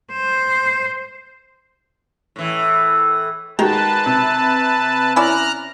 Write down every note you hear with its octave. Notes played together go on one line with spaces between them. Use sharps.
C5
A2 E3
D#3 G#3 F#4 B4 A5
C3
C#4 E4 D5 A#5 F6 F#6